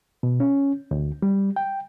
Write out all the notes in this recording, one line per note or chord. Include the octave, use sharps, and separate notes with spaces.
B2
C#4
D2
G3
G5